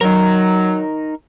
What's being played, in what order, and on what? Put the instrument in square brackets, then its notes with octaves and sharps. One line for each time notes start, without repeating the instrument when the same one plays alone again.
[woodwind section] F#3 [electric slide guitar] D#4 A#4